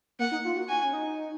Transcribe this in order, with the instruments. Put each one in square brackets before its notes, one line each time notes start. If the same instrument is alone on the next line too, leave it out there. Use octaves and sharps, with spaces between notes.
[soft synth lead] A#3 [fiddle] F#5
[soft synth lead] D#4
F4
F#4
[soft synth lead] F#4 [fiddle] G#5
[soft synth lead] C#4
D#4